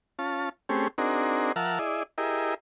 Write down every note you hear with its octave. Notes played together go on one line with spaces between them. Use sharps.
C#4 F4 A5
A3 C4 C#4 G4 G#4
C4 D4 D#4 F#4 G#4 A#4
F3 A#4 E5 F#5 A5 F6
E4 G#4 D5 D#5
E4 G4 G#4 A#4 D#5